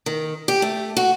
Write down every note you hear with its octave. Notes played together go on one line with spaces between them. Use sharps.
D#3
G4
A3
F#4